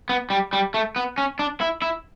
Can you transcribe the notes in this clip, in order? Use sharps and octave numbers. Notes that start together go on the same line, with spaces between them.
B3
G3
G3
A3
B3
C#4
D4
E4
E4